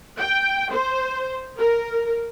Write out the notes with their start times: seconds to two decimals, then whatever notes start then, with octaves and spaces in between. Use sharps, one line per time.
0.19 G5
0.72 C5
1.58 A#4